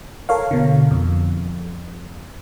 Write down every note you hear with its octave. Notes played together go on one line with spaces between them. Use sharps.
A4 A#4 C#5 F5
B2 D3
F2